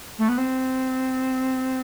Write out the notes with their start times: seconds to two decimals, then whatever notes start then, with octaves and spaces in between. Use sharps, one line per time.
0.19 A3
0.29 B3
0.38 C4